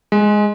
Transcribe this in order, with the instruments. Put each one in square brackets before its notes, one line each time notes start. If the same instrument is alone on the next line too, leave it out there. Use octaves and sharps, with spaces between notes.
[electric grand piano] G#3